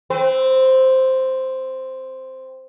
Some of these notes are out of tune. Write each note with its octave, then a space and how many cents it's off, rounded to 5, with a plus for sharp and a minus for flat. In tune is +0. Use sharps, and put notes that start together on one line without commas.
C4 +0 B4 +45